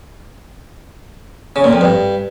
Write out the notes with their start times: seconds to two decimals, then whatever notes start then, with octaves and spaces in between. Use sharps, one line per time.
1.56 C#3
1.64 A#2
1.73 F2
1.81 G2